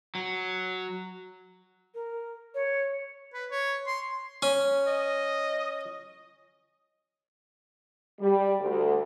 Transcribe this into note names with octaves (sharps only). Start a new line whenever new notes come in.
F#3
A#4
C#5
B4
C#5
C6
C#4
D#5
G3
D2